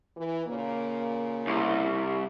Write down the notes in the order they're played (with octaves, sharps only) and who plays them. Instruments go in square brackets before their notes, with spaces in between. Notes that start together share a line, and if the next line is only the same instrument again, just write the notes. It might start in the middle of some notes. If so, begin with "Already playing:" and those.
[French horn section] E3
A#2 C#3 A#3
[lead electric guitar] C2